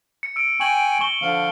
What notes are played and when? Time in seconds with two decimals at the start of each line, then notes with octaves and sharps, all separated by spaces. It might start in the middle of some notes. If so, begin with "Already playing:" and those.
0.23 C#7
0.36 E6 D7
0.60 G5 G#5 C#6 F#7
1.01 C#6 G7
1.22 D3 F3 F5